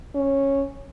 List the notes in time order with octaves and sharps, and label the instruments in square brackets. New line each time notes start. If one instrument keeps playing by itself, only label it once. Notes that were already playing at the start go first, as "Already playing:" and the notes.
[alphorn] C#4